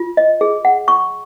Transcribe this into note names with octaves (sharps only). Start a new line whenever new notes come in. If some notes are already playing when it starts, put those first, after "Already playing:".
Already playing: F4
D#5
G#4
F#5
C#6